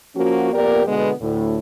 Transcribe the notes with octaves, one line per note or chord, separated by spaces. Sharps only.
F3 A#3 C#4 F#4
F2 A#3 B3 G4 A#4 D5
B2 D3 G#3 B3
D2 A2